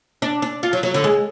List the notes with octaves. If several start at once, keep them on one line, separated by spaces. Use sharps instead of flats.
D4
D4
F4
F#3
F#3
D3
G#3